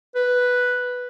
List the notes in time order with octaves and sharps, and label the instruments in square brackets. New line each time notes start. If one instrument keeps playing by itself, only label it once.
[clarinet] B4